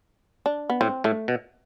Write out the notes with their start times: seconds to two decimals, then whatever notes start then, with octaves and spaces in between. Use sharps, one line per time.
0.46 D4
0.70 B3
0.81 A2 C4
1.04 A2 A3
1.28 B2